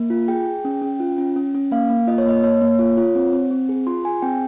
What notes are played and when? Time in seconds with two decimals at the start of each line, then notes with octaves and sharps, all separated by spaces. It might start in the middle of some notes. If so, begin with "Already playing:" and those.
Already playing: A#3
0.10 F4
0.28 G#4 G5
0.46 G#4
0.65 C#4
0.82 C#4
1.00 F4
1.18 C#4
1.36 C#4
1.54 C#4
1.72 A#3 F5
1.90 A#3
2.07 F4 D#5
2.18 C#5
2.26 A#3 D#5
2.43 A#3 C#5
2.62 A#3
2.79 F4
2.97 F4
3.15 C4
3.33 C4
3.51 C4
3.69 G#4
3.87 F4 C6
4.04 G#4 G#5
4.22 C4 G5